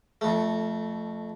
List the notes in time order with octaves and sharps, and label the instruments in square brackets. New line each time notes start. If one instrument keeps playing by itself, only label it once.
[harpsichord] F2 A3